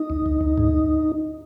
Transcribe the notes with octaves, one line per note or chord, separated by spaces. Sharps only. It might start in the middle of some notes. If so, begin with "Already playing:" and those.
Already playing: D#4
D2
D2
D2
G#2